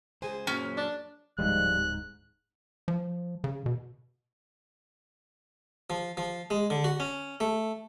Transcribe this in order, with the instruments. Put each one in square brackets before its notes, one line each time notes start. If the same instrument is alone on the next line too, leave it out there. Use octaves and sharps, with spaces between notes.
[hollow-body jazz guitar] C#2 G#5 [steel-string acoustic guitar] G#4 C5
[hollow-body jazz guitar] F#2 A#2 F#3 [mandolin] C#4
[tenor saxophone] D4
[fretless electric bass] D1 G#2 [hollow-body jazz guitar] F3 G3 G#3 [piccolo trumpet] F#6
[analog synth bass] F3
C#3
B2
[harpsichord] F3
F3
G#3
D3
F#4
C#4
A3